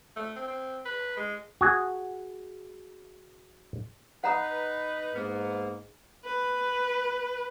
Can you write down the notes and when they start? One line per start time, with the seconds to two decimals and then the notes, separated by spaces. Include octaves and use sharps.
0.16 A3
0.36 C4
0.48 C4
0.85 B4
1.17 G#3
1.61 F#4 G#4
4.24 D#4 B4 F#5 A#5 D#6
5.15 G#2 A#3 B3
6.25 B4